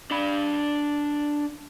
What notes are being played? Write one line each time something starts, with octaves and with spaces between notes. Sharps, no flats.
D4 B5